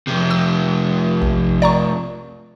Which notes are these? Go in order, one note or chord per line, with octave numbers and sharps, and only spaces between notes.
F2 C3
E6
A#1
D5 A#5 C#6